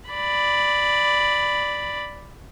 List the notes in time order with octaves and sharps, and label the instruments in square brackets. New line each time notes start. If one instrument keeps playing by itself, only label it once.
[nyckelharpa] D5 B5